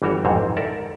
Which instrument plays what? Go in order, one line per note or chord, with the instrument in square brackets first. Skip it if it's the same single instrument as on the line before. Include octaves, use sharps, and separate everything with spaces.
[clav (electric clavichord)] G1 E3 G3 F#4 C#5 G5
A1 F2 G#2 C4 C#5
A4 A#4 D5 E5 F#5